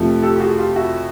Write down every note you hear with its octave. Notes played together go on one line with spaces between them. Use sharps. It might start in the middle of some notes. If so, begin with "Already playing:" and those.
Already playing: F2 C3 F3 A3
G4 A4
G4
F#4 G#4
F4 G4
E4 F#4